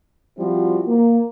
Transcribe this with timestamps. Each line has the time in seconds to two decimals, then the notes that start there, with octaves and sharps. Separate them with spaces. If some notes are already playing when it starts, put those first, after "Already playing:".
0.38 F3 G3 C4 E4 F#4
0.87 A#3